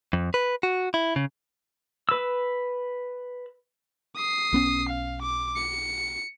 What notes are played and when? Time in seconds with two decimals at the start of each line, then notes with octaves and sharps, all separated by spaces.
0.13 F2
0.34 B4
0.63 F#4
0.94 E4
1.16 C#3
2.09 B4 E6
4.16 D#6 C7
4.53 B1 B3 C#4
4.89 F5
5.22 D6
5.56 C#7